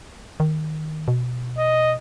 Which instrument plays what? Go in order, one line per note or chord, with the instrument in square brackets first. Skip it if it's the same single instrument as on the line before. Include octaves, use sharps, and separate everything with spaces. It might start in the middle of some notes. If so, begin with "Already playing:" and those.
[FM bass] D#3
B2
[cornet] D#5